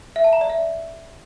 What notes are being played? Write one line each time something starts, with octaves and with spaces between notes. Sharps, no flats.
E5
A5
A#5
D5
E5